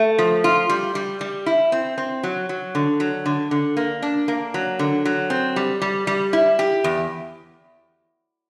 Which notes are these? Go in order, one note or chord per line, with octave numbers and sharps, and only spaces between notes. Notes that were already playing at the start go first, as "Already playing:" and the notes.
Already playing: A3
F3
F4
G3
G3
G3
E4
C4
C4
F#3
F#3
D3
F#3
D3
D3
A#3
D4
A#3
F#3
D3
F#3
C4
G3
G3
G3
E4
G4
E2